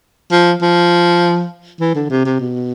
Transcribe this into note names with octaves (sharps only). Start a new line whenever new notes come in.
F3
F3
E3
D3
C3
C3
B2